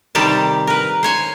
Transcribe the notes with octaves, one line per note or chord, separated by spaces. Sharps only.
C3 D#3 G3 G4 A5
A#4 B4
C5 C#5 G#5